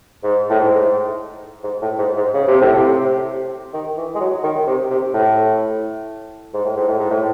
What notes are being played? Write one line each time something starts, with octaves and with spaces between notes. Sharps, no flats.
G#2
A2
G#2
G#2
A2
G#2
G#2
C#3
C3
A2
C3
D#3
E3
G#3
F#3
D#3
C3
C3
A2
G#2
A2
G#2
A2
G#2
A2